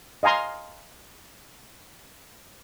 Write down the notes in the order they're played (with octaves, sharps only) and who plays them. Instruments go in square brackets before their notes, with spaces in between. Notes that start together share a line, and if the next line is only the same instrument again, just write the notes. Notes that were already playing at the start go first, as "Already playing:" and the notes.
[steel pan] D#5 F5 G#5 A#5 C6